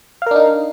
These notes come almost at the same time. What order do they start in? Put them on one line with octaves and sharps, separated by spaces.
F5 A#4 D4 D#4